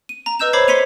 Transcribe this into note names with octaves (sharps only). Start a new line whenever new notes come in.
D#7
A#5
B4 D#5 E6 G6 E7
C5 C#5 B5 D6 G#6 C7
C6 G#6 B6 C#7 D#7 F7